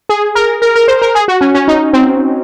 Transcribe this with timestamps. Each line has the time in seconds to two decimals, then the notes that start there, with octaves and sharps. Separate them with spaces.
0.09 G#4
0.35 A#4
0.62 A#4
0.76 A#4
0.88 C5
1.02 A#4
1.15 G#4
1.28 F#4
1.41 C#4
1.55 C#4
1.68 D#4
1.93 C4